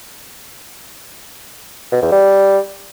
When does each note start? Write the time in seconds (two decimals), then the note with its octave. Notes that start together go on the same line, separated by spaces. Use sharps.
1.92 B2
2.02 E2
2.12 G3